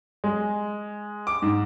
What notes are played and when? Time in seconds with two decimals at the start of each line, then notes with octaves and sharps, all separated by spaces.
0.24 G#3
1.27 D6
1.42 G#2